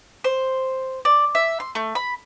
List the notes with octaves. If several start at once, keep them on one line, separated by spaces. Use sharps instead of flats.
C5
D5
E5
C6
A3
B5